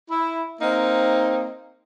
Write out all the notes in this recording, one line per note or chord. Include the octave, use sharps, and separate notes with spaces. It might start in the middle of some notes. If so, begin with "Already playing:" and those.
E4
A#3 C4 D#4